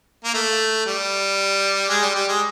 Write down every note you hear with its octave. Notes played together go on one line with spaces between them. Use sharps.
A#3
A3
G3
G#3
G3
G3
G#3